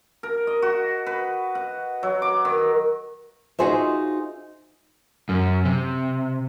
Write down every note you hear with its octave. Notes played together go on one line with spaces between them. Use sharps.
A#4
D#5
F#4
B4
F#5
F#3
D6
D#3
D#4 F4 F#4 G#4 C5 E5
F#2
C3